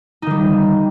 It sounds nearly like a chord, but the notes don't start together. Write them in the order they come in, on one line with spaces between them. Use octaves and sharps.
D#4 D#3 G3